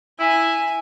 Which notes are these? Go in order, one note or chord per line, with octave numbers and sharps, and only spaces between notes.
E4 G#5